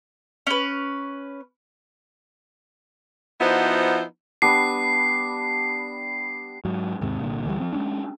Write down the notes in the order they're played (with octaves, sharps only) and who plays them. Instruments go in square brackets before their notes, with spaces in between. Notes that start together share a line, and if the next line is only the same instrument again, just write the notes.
[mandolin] C#4 B4
[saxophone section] F3 B3 D#4 E4 F#4 C5
[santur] G3 B3 D4 [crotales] C7
[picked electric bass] G#2 F#3
D#2 G#2 C3
C2 A#2 D3
D2 E3 F#3 G3
F3 C4
G#3 C#4 D4